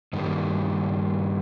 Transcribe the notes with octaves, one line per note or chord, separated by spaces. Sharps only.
G2 D#3 G3 A#3